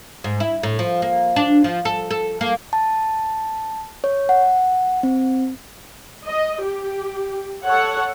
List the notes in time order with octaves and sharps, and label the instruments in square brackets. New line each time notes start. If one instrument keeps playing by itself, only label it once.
[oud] G#2
E4
A2
F3
A#3
D4
F3
A4
A4
A#3
[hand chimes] A5
C#5
F#5
C4
[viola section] D#5
G4
A4 C#5 F#5